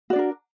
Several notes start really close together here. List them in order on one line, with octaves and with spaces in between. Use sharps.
F#4 D5 D4 A#4